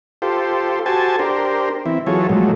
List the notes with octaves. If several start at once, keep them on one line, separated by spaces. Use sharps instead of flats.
F4 G4 A4 C5
F#4 G4 A4 C5 G#5 A5
D4 G4 A#4 C5
E3 C4 E4
E3 F#3 F4 G#4 A4 C#5
A#2 F3 F#3 G#3 A3